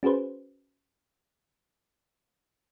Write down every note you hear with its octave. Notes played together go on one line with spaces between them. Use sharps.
C#4 F#4 G#4 B4 C5